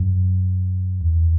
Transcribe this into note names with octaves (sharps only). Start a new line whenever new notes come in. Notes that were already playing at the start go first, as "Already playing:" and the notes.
Already playing: F#2
E2